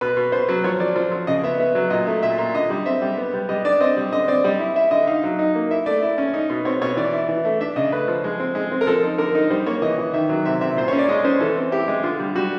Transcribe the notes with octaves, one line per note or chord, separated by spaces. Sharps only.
B2 B4
B2
B2 C5
F#3
F3 C#5
F3 D5
F3
F3
C#3 D#5
B3 E5
B3 E5
F#3
A#2 D#5
A3
A#2 E5
A#2
D3 D#5
G3
C4 E5
G3
B3
G3
G3 D#5
D4 D5
C4 D#5
G3
D3 D#5
C4 D5
G3 D#5
E4
E4 E5
D3 D#5
D#4 F5
F#3
D#4
A#3
E4 E5
A3 D5
E4
C#4
D#4
B2
C4 C#5
B2 C#5
E3 D5
E4
E3
A3
D4 E5
C#3 D#5
A3 B4
F3
G#3
C4
G#3
C4
A#4
F3 A4
D#4
D3 A#4
D#4
G3 C5
A#3 C#5
E3 D#5
E3
D#3 E5
F#3
C3 E5
C3 E5
A#2 C5
C#4 C#5
D5
G#3 D#5
C#4 C5
E3 A4
C4
E4 G4
G#3
D3 F4
G3
G3 F#4